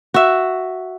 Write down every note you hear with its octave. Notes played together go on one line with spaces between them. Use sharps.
F#4 E5